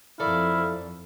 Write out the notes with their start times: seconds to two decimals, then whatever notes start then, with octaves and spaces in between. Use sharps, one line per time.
0.20 F2 E4 A4 A#4 D5 F5